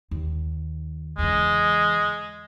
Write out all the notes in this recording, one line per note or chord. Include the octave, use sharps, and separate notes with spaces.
D#2
E2 C#3 G#3